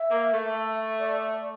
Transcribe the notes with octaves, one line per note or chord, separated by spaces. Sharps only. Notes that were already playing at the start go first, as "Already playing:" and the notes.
Already playing: E5
A#3
A3
D5
D5